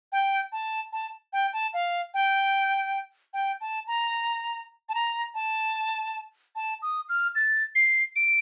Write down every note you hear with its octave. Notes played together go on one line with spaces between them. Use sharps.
G5
A5
A5
G5
A5
F5
G5
G5
A5
A#5
A5
A#5
A5
A5
D#6
F6
A6
C7
D7